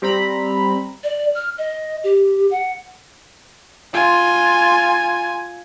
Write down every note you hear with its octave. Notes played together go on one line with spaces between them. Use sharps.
G3 C4 A#5 B5
D5
F6
D#5
G4
F#5
F4 G#5